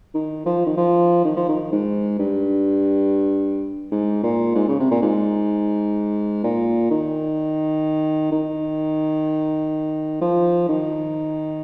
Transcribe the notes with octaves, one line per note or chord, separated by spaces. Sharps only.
D#3
F3
D#3
F3
D#3
F3
D#3
G#2
G2
G#2
A#2
G#2
C#3
C3
A#2
G#2
A#2
D#3
D#3
F3
D#3